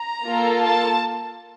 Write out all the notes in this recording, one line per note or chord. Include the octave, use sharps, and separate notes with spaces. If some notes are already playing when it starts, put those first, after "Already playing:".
Already playing: A#5
A#3 F4 A4
A5